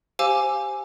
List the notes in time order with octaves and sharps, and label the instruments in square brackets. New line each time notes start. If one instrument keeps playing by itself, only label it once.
[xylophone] G4 C5 F5 G#5 D6 E6